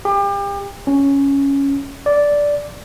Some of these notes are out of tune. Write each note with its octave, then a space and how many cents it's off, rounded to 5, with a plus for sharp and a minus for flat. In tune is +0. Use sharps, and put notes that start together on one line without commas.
G4 +35
C#4 +0
D5 -10